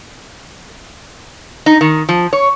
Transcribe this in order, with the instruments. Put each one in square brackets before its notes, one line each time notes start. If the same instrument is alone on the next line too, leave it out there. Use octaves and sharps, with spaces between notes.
[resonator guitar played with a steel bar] D#4
D#3
F3
C#5